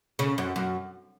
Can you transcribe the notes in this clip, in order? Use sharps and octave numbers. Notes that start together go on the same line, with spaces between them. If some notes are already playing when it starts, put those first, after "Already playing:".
C#3
F#2
F#2